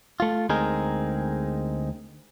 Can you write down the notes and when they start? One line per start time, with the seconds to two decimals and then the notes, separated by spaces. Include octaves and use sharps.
0.20 A3 F4
0.49 D2 G#3 C4 D#4 G#4 A#4